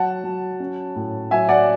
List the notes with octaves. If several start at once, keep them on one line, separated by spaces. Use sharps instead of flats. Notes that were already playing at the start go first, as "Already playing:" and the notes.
Already playing: F#3 F#5 A5
F#3
C#4
A2
F#3 E5 G#5
D5 F#5